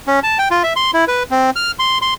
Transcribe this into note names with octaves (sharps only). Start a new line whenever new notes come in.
C#4
A5
G5
F4
E5
C6
E4
B4
C4
F6
C6
C6